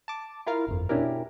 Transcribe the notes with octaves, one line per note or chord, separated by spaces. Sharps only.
A5 D6
E4 F4 A#4 F5
G1 F2
B2 C#4 D4 E4 G4 A#4